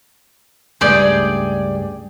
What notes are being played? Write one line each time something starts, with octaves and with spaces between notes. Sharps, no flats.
C#2 G2 A3 G#4 D5 G5